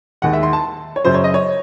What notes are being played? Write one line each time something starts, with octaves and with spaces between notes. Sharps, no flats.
D#2 D#3 G#3 F#5
E5
C6
A5
C#5
F#2 C#3 F#3 C5
C#5
D#5
C#5